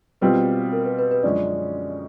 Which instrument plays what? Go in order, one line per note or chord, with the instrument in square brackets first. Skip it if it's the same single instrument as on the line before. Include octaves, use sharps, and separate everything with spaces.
[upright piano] B2 G3 C4 F4 [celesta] B4
[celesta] A#4
B4
B4
B4
[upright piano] F#2 D3 F3 G#3 C#4 [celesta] D5